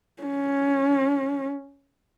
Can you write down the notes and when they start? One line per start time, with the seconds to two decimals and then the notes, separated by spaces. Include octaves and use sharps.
0.23 C#4